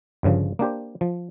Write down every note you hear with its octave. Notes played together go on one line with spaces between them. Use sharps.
G1 G2 C#3 F3
A#3 D4 G4 C5
F3